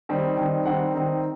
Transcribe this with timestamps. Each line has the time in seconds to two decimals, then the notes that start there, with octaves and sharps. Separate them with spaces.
0.09 D#3 G3 C4 D#4
0.37 D#3 G3 C4 D#4
0.65 D#3 G3 C4 D#4 F#5
0.94 D#3 G3 C4 D#4